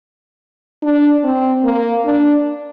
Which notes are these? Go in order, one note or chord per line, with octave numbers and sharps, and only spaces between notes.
D4
C4
A#3
D4